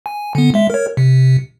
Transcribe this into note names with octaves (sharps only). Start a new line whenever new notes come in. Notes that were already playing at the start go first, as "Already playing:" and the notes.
G#5
D3 B3
G#3 E5
A#4 C#5
C3